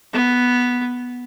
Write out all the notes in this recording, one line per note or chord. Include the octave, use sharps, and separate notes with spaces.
B3